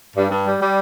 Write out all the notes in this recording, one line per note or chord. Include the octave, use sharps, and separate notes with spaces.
G2
G2
G3
G3